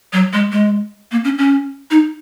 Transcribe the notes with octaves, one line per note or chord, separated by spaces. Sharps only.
F#3
G#3
G#3
A#3
C#4
C#4
D#4